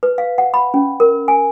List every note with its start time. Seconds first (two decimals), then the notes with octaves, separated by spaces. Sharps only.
0.03 B4
0.18 F5
0.38 F#5
0.54 B5
0.74 C#4
1.00 A#4
1.28 G#5